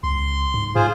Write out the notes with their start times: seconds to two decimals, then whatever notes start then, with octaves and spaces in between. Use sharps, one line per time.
0.03 C#2 C6
0.54 G#2
0.75 G#2 F4 G#4 C5